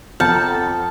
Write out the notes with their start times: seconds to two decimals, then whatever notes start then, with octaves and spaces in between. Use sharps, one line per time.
0.20 F2 A4 F#5 A5 A#5 F6 G6 C#7